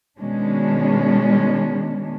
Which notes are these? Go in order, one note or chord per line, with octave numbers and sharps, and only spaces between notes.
B2 D#3 G#3 C#4 D4